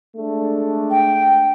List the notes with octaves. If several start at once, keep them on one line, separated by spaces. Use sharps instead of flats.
G#3 A3 D4
G5